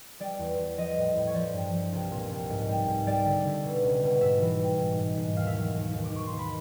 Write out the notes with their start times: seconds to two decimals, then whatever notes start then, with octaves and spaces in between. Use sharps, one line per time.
0.20 G3 D5
0.39 E2
0.59 E2
0.78 F3 D#5
0.97 A2
1.15 A2
1.27 C#5
1.34 F3 D5
1.53 G2
1.72 F3
1.92 C2
2.11 A#2
2.30 C2
2.50 G#2
2.68 G3
2.87 G#2
3.07 G3 D5
3.25 D3
3.45 D3
3.65 B2
3.83 C#2
4.03 B2
4.21 G#2 E5
4.41 E3
4.60 G3
4.79 G#2
4.99 G#2
5.17 G#2
5.36 D#2 F5
5.47 E5
5.56 F#3 F5
5.75 D#2
5.93 D#2
6.04 D6
6.13 D#2 C#6
6.27 D#2 C6
6.39 B5